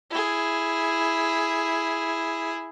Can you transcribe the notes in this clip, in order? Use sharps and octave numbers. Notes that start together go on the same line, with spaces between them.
E4 G#4